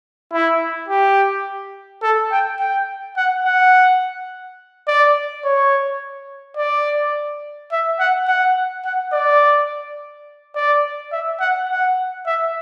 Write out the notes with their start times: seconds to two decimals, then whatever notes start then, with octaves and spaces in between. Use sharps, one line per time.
0.33 E4
0.89 G4
2.03 A4
2.31 G5
2.60 G5
3.17 F#5
3.44 F#5
4.88 D5
5.44 C#5
6.57 D5
7.72 E5
7.99 F#5
8.28 F#5
8.85 F#5
9.13 D5
10.56 D5
11.12 E5
11.40 F#5
11.70 F#5
12.26 E5